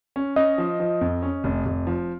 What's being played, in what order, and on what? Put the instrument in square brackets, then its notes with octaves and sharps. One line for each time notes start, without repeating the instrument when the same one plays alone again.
[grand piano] C#4
[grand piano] C#4 [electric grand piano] D#5
[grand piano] F3
F3
F2
C#4
F1
F1
F3